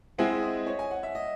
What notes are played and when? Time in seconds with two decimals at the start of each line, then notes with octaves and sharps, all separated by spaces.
0.18 G#3 C4 E4 G#4 F#5
0.30 E5
0.43 D#5
0.67 C#5
0.79 G#5
0.91 F#5
1.03 E5
1.15 D#5